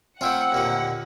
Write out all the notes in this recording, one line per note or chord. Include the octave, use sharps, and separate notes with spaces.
A3 C4 E4 F4 F#5
D#2 A#2 D3